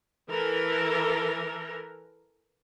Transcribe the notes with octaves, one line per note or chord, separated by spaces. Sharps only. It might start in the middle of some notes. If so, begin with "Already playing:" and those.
E3 A4 A#4